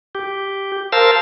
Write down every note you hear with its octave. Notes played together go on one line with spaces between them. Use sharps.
G4
A#4 C5 F5 A5 E6